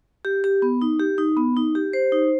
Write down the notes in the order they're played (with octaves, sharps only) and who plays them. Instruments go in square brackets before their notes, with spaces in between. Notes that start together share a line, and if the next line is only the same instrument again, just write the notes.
[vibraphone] G4
G4
B3
D#4
G4
D#4
B3
D#4
G4
C5
D#4